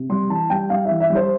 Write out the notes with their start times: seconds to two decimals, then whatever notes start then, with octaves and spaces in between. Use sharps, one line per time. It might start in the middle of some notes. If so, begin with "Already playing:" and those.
Already playing: C3
0.09 G3 C6
0.30 E3 A5
0.50 G3 G5
0.70 G3 F5
0.85 E5
0.90 E3
1.00 E5
1.10 G3
1.15 C5